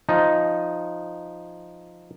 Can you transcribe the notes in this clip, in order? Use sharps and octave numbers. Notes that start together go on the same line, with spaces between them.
F3 D#4